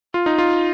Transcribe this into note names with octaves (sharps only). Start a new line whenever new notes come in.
F4
D#4
F4